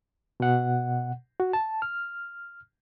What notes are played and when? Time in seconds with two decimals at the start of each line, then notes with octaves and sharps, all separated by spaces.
0.40 B2 F#5
1.40 F#4
1.53 A5
1.82 F6